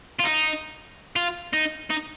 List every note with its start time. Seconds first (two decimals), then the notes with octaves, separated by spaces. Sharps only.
0.19 F4
0.24 D#4
1.16 F4
1.53 D#4
1.90 D#4